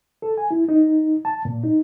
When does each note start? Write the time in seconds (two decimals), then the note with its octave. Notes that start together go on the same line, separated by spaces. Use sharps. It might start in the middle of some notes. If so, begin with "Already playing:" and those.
0.22 A4
0.38 G#5
0.51 E4
0.69 D#4
1.25 A5
1.45 A#2
1.64 D#4